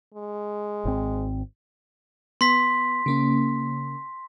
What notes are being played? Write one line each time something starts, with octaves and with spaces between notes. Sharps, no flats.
G#3
G#1 C4
B3 C6 B6
C#3 A#3 C#4